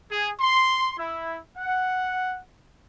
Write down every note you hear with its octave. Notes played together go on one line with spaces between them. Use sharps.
G#4
C6
E4
F#5